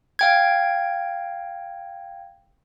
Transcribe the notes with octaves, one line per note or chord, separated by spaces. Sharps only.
F5 G5 G#6